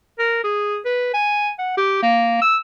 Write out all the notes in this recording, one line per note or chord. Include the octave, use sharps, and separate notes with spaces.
A#4
G#4
B4
G#5
F#5
G4
A#3
E6